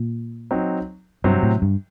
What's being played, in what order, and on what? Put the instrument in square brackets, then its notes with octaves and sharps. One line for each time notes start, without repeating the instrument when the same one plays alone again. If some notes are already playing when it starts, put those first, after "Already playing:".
Already playing: [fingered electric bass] A#2
[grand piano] F#3 C4 D#4
[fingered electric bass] G2 [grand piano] C3 F#3 C4
[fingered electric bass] A2
G2